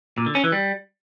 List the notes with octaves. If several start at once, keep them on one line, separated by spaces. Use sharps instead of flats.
A#2
D3
C#4
E3
G3